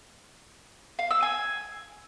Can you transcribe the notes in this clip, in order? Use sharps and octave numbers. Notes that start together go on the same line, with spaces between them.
F5
E6
G#5